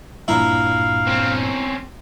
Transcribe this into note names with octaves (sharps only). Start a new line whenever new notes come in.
G2 A#2 E4 F5 A#5
C4 C#4